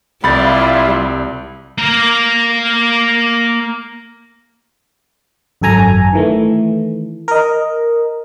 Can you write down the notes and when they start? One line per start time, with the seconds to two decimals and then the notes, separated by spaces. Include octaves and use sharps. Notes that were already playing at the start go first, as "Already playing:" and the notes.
0.24 C2 G3 E4 F4 B5 A6
1.78 A#3 A#4
5.61 G#1 F#2 A4 G#5 A#5
6.13 D#3 E3 A3
7.28 A#4 D#5